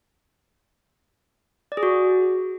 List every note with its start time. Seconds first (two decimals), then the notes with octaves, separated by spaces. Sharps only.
1.72 D5
1.77 G#4
1.83 F#4